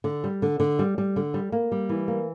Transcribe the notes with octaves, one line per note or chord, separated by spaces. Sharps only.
D3
G3
D3
D3
G3
G3
D3
G3
A#3
G3
E3
A#3